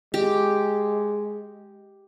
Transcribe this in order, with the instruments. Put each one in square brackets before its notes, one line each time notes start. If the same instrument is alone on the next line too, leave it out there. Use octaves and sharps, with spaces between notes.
[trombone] G#3 [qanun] G4